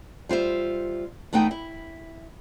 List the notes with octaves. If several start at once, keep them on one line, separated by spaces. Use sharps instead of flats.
G3 F4 C5 E5
E2 A3 B3 D#4 G5
E4